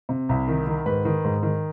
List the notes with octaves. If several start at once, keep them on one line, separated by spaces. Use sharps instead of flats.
C3
C2
D#3
D#3
G#2 B4
D#3
G#2
D#3